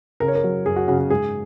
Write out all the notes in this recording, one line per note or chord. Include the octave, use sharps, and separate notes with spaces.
C#3 A#4
C#5
A#4
F#3
F#2 G#4
F#4
C#3 F#4
F#4
G#2 G#4